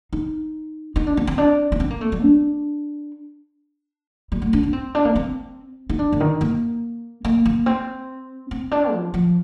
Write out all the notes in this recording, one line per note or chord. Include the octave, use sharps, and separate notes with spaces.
D#4
D#4
D4
C4
C4
D4
D4
C4
A#3
A3
G3
D4
G3
A3
D4
D4
C4
D4
A#3
C4
D#4
D4
D3
D#3
A#3
A#3
A#3
C4
C4
D4
F3
F3